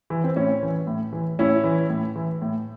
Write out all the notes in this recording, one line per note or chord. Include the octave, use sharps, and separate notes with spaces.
E3
C4
A2 C#4
E3
A2
E3
A2 C#4 E4
E3
A2
E3
A2